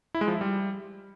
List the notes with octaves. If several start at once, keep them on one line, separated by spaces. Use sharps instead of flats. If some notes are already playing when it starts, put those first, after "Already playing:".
E4
G#3
F3
E4
G3